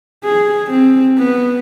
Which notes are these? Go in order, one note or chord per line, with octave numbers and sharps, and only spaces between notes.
G#4
C4
B3